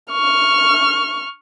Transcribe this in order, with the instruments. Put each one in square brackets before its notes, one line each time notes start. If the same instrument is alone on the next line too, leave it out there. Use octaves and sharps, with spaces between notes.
[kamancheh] C#6 F6